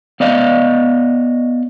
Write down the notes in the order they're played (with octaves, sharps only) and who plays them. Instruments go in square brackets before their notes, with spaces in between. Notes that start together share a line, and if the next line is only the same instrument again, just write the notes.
[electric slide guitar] B3 D5 D#5 F5